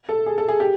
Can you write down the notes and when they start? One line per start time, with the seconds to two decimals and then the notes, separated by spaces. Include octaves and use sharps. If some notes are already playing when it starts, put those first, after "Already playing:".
0.09 A4
0.26 G#4
0.38 A4
0.49 G#4
0.60 G4